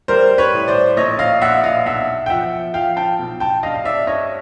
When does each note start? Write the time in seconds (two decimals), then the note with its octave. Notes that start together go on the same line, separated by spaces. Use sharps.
0.08 G3 A#4 C5
0.38 B4 C#5
0.53 A2
0.68 C5 D5
0.97 A#1 C#5 D#5
1.19 D#5 F5
1.41 A#1 E5 F#5
1.64 D#5 F5
1.86 B1 E5 F#5
2.26 G5
2.30 F3 E5 F#5
2.74 F3 F5 G5
2.97 G5 A5
3.19 B1
3.40 G5 A5
3.63 G2 D#5 F5
3.74 F5
3.85 D5 E5
4.07 G2 C#5 D#5